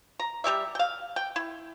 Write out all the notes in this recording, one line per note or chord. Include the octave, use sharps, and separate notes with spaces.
A#5
G3 G4 D5 E5
F5 G5
G5
E4